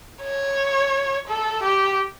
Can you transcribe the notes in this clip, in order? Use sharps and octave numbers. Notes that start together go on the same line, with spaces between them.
C#5
A4
G4